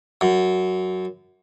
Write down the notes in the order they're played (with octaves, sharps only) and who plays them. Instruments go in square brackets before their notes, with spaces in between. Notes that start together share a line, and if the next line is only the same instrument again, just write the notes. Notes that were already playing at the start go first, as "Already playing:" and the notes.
[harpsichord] F#2